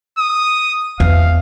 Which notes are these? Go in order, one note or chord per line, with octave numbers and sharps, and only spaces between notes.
D#6
E2 F5